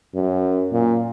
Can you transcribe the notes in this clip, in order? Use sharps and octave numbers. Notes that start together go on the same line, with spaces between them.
F#2
A#2